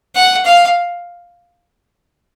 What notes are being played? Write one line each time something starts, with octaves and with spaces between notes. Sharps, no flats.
F#5
F5